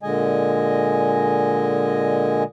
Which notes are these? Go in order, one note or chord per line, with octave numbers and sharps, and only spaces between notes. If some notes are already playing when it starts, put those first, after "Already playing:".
A#2 D3 G#3 D#5 G#5